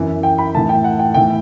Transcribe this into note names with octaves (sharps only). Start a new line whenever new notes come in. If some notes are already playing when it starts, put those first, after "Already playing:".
Already playing: F#2 E3
G5
B5
A2 E3 A5
G5
F#5
G5
A2 E3 G5